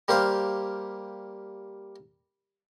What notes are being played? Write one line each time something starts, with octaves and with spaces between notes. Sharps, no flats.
G3 A#3 G4 C5 F5